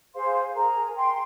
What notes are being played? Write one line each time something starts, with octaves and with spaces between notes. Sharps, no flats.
G#4 C5 F5 C6
G#4 A#4 A#5
G5 C6